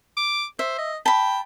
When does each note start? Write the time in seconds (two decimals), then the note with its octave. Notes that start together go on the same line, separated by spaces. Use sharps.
0.17 D6
0.59 C5 E5
0.79 D#5
1.06 G5 A5 B5